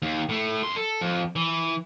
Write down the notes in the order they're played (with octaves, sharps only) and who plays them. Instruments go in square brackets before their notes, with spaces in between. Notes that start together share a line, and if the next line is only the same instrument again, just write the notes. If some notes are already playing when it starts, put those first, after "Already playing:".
[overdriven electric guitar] D#2
A2 A3
F#2 C6
A4
F2
E3